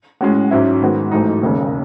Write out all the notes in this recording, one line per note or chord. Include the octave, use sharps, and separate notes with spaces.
A2 G#3 C#4 F#4
G#2 F#3 C#4 E4
G#2 D#3 G#3 B3 F#4
A1 G#2 F#3 A3 D#4
E1 D#2 C#3